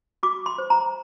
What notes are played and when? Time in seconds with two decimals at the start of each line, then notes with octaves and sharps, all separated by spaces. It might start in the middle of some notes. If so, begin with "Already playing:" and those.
0.23 F#4 D6
0.46 C6
0.58 C5
0.70 A#5